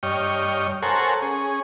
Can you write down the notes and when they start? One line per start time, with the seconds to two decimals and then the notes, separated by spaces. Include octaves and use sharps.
0.03 G2 C#5 D#5 G5 F6
0.82 A4 A#4 C5 C#5 F#5 G#5
1.22 C#4 G#4